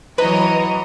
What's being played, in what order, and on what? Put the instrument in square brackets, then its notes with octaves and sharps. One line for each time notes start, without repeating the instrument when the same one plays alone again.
[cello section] E3 F#3 [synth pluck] B4 [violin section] C#5 D#5 [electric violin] A#5